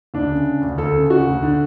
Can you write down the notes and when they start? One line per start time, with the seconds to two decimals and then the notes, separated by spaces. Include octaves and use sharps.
0.14 D2 D4
0.30 C#3
0.46 C#3
0.62 D2
0.78 D2 A4
0.94 C#3
1.10 C#3 F#4
1.27 D2
1.43 D3